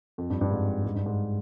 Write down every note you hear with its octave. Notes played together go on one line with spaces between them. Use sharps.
F2
G2
G2
G#2
G#2
G2
G#2